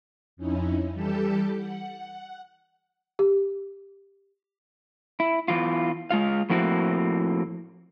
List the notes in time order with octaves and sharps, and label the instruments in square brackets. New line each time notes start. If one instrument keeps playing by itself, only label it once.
[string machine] F2 C#4 D#4 E4
E3 G3 G4 A4 A5 G6
F#5
[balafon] G4
[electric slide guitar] E4
E2 A#2 E3 F4
G#3 F4 F5
A2 F3 A#3 C4 E4 F#4